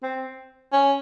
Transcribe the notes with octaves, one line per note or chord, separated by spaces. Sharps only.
C4
C#4